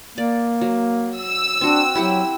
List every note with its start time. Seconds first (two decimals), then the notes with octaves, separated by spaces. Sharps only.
0.18 A#3 D5
0.61 F#3
1.19 E6
1.61 C4 D4 F#4
1.95 F#3 E4 G4 F#5